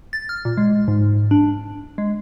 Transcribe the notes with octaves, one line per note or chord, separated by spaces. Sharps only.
A6
F6
A#2
G#3
G#2
D4
G#3